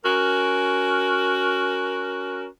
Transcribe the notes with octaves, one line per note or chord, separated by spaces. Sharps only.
C#4 F#4 A#4